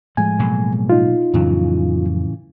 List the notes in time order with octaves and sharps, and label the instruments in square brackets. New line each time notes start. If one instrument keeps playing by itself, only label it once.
[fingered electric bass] A2 F3 G#3 [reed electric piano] G#5
[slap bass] B2 F#3 A#3
[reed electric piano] D#4 F4
[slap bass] F2 F#3 [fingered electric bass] A2 C#3 E3